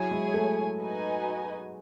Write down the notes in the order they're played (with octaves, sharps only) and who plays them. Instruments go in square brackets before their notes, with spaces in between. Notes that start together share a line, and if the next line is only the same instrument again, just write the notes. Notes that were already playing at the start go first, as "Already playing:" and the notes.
Already playing: [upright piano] F#3 [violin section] E4 G#4 C#5 G#5
[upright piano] G#3
A3
[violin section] D#4 F#4 B4 D#5 G#5